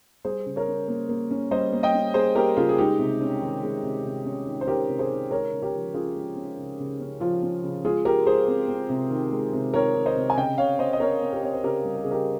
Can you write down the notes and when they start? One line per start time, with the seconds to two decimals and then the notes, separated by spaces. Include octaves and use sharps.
0.25 G3 G#4 C5
0.46 C#3
0.56 A#4 C#5
0.67 C#4
0.88 A#3
1.09 A#3
1.30 C#4
1.51 G3 C5 D#5
1.72 A#3
1.83 D#5 G5
1.94 C#4
2.14 A#3 G#4 C5
2.35 A#3 G4 A#4
2.57 C#3 F4 G#4
2.69 G#4
2.78 G#3 D#4 G4
2.99 C3
3.21 C#4
3.42 D#3
3.63 G#3
3.83 C3
4.05 C3
4.25 C#4
4.46 D#3
4.61 C5
4.67 D#3 G4 A#4
4.89 C3
4.99 G#4 C5
5.10 D#3
5.31 G#3 A#4 C#5
5.53 C#3
5.62 G4 A#4
5.73 F3
5.94 C#4 F4 G#4
6.16 G#3
6.36 C#4
6.58 C#3
6.79 C#3
7.00 C#4
7.20 F3 F4
7.42 C#4
7.63 C#3
7.84 G#3 F4 G#4
8.05 G#3 G4 A#4
8.26 G#3 G#4 C5
8.48 C4
8.68 C4
8.89 C3
9.11 D#3
9.32 G#3
9.53 C3
9.73 D#3 A#4 C#5
9.95 D#3
10.06 C5 D#5
10.16 C3
10.30 G#5
10.37 C#3 D#5 G5
10.58 C#3 C#5 F5
10.79 C4 C5 D#5
10.93 D#5
11.00 C4 A#4 C#5
11.22 C4
11.32 G4 A#4
11.43 C4 C#5
11.53 C5
11.63 C#3 G4 A#4
11.85 G3
11.96 A#4
12.04 C#3 G#4
12.11 G4 A#4